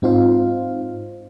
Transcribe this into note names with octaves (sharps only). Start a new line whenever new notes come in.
G#2 C4 D#4 F4 C5 F5